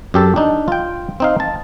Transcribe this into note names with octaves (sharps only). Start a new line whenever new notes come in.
F#2 G4 A4
D4 D#4
F4 G5
C4 D#4 F5
A5